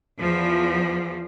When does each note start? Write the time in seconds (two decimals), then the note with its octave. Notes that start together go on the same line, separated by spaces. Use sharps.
0.19 E2 F3